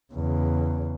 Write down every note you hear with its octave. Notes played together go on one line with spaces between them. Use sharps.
E2 C#3